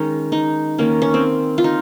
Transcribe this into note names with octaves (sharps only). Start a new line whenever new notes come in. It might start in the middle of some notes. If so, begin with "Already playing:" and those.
Already playing: D#3 G#3 C#4 D#4
D#4
D#3 A#3 C#4
C#4
C4
F4
D#4